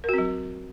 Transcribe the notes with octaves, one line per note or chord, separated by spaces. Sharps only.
F#3 C4 F#4 A#4